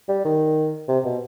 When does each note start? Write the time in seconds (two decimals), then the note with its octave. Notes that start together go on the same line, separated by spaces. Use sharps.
0.09 G3
0.25 D#3
0.88 C3
1.05 B2